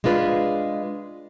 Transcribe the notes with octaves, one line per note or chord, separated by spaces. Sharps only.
G#3 D4 F4 B4